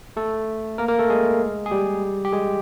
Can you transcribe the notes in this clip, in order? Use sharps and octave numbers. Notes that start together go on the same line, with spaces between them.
A3 A4
A#3 A#4
A#3 A#4
A3 A4
G#3 G#4
G#4
G3 G4
G4
G#3 G#4